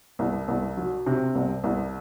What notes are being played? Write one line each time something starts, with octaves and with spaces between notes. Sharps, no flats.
C2
C2
F#3
C3
C2
C2